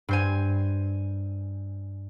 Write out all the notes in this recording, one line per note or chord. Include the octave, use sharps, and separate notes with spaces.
G2 C5 G#5